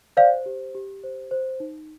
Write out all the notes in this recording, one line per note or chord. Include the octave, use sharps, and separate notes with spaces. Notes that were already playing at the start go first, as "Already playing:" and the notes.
C5 D5 F5
G4
G4
C5
C5
D#4